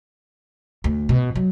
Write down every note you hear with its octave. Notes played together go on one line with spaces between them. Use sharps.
D2
B2
F#3